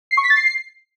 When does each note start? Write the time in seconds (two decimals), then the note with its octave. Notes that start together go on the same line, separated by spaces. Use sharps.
0.11 C7
0.17 C#6
0.24 B6
0.30 A6
0.36 C7